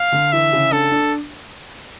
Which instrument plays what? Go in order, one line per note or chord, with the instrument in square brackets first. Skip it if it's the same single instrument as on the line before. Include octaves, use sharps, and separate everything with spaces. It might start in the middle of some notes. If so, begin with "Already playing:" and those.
Already playing: [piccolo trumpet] F5
[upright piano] D3
[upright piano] E3 [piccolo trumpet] E5
[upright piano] C#3
[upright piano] D4 [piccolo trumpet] A4
[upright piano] D4